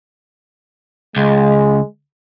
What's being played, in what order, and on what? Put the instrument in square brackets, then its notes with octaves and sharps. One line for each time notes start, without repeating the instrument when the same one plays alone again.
[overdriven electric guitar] C#2 [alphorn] G#3